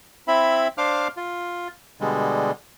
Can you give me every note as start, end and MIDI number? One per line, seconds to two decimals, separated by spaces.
0.28 0.68 60
0.28 0.68 64
0.28 0.68 76
0.28 0.68 83
0.78 1.08 62
0.78 1.08 72
0.78 1.08 77
0.78 1.08 86
0.78 1.08 89
1.17 1.68 65
2.01 2.51 47
2.01 2.51 50
2.01 2.51 55
2.01 2.51 56